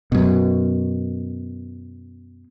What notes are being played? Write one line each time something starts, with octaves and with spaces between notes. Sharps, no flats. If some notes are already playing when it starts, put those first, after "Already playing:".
F#2 B2